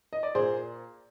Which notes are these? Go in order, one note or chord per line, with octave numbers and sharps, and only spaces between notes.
D#5
D5
A#2 G#4 C5